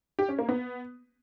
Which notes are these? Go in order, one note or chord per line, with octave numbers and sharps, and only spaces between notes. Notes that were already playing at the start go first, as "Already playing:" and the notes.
G4
C#4
A#3
B3